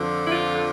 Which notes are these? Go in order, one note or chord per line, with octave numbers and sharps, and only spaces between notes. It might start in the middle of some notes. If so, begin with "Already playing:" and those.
Already playing: F2 D3 F3
E4
F4